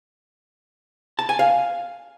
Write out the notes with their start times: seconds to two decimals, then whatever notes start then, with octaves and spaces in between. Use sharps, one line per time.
1.19 A5
1.29 G#5
1.39 F5